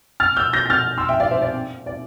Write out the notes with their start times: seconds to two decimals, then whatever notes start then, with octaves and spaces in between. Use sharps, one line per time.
0.20 F6 A6
0.36 E6 G6
0.53 G6 A#6
0.66 A#6
0.70 F6 A6
0.98 C6 E6
1.08 E5 G5
1.20 D5 F5
1.31 C5 E5
1.42 D5
1.86 D5